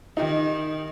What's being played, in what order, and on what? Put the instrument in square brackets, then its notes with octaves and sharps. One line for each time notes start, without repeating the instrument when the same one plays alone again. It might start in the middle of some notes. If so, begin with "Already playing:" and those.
[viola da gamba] D#3 [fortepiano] D#4 G4